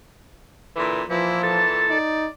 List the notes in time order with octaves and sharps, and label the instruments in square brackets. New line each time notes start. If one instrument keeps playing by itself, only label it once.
[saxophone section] A#2 D3 E3
[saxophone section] A#2 E3 [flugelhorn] F3 [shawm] E4
[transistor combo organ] A4 [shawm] A5
[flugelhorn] D#4 [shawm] D5